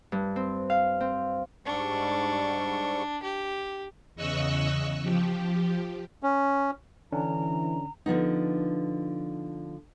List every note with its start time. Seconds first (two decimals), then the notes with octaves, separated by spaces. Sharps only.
0.12 G2
0.36 C4
0.70 F5
1.00 C4
1.65 G#2 G3 D4 C#6
3.23 G4
4.15 E2 C#3 D#5 C#6 E6 F#6
5.03 F3 G4
6.23 C#4
7.13 D3 E3 C#4 D4 A#5
8.06 D3 F3 B3 D#4